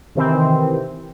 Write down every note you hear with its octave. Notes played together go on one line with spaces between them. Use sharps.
C3 D#3 E3 C4